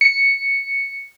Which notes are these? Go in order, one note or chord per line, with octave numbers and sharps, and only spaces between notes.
C#7